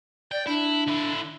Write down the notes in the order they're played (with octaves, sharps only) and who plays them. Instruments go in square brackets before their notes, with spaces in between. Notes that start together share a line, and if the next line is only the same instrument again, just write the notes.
[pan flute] D5 [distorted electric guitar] G5
[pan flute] D4 [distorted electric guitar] E4
[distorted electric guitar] D3 E4